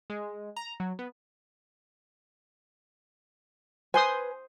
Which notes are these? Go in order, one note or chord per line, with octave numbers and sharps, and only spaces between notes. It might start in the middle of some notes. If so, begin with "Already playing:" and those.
G#3
A#5
F#3
B3
B4 C5 G#5 C6 D#6